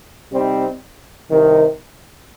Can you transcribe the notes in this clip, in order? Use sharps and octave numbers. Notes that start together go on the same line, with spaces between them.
C3 G3 C4 D#4
C2 C3 D#3